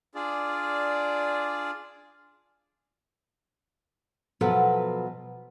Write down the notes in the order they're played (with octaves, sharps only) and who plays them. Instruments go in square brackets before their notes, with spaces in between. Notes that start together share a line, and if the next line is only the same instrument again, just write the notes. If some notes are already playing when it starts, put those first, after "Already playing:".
[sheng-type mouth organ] D4 F4 G#4 D5
[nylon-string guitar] B2 F3 F#3 A4 B4 F#5